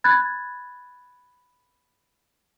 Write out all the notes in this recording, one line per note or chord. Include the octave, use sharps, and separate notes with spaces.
B5 F#6 G#6 A6